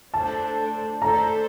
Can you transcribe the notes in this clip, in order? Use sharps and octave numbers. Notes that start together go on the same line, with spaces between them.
A3 D4 A4 C5 A5
A3 D4 A4 C5 A#5